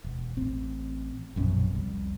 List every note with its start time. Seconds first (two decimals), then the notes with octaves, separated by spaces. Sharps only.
0.04 E1
0.37 A1 C4
1.36 A#1 F#2 B2 C#4
1.73 F1 C2